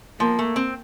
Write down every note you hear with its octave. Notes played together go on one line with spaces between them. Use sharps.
F3 A#3
A3
C4